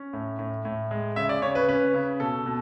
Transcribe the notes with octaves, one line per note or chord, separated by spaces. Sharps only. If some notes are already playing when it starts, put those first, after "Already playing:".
Already playing: C#4
A2
A2
A2
G#3
C#3 E5
D5
C#3 C#5
B4
C#4 B4
C#3
B2 A4
B2